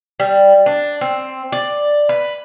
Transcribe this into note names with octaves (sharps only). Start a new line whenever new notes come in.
G3
D4
C4
D5
B4